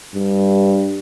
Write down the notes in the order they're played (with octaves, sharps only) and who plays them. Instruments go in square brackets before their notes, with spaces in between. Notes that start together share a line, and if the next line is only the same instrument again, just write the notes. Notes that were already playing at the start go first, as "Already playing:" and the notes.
[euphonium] G2